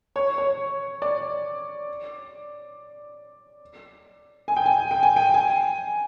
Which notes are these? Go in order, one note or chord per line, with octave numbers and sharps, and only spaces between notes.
C#5
C#5
D5
G#5
G5
G#5
G5
G#5
G5
G#5